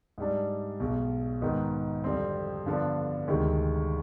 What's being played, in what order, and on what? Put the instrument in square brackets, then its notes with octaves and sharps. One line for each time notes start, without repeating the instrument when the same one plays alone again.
[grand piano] G#2 G3 D4
B1 B2 G#3
G#2 D#3 B3 D#4
F2 D3 G3 C4
G2 D3 F3 B3 D4
D2 C3 D#3 G#3